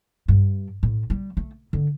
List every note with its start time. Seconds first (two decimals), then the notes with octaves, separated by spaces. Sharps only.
0.28 G2
0.83 A2
1.10 G3
1.37 A3
1.73 D3